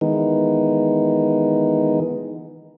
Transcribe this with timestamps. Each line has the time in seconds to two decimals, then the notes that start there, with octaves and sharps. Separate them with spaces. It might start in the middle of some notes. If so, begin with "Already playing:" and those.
0.01 D#3 E3 G#3 B3 D#4